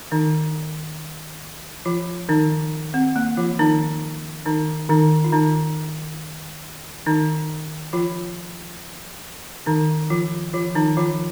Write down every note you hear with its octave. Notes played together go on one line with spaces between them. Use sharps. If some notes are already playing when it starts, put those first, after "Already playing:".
D#3 D#4
F3 F4
D#3 D#4
C4
A#3
F3 F4
D#3 D#4
D#3 D#4
D#3 D#4
F4
D#3 D#4
D#3 D#4
F3 F4
D#3 D#4
F3 F4
F3 F4
D#3 D#4
F3 F4